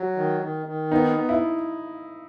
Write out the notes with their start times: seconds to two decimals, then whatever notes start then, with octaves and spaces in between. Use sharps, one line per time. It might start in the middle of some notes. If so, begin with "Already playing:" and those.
Already playing: F#3
0.16 D#3
0.42 D#3
0.66 D#3
0.91 B3 D#4
1.16 B3
1.29 E4